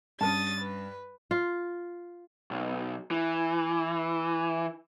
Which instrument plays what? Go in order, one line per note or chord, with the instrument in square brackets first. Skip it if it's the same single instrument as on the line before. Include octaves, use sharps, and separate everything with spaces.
[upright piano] G2 [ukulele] C#4 A#4 A5 [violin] D#6 A6
[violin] B4
[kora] F4
[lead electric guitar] B1
E3